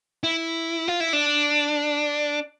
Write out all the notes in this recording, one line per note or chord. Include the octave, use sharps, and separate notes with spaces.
E4
F4
E4
D4